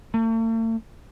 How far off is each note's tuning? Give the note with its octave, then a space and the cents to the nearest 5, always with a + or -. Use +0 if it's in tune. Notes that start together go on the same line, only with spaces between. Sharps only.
A3 +45